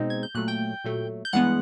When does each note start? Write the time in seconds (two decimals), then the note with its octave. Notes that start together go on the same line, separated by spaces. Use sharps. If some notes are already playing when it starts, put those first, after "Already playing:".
Already playing: B2 G#3 C4 D#4
0.10 G#6
0.23 G6
0.34 A#2 F#3 A3 F#6
0.48 G5 G6
0.84 A#2 F#3 A3
1.25 G6
1.33 G2 E3 G#3 B3 F#5 F#6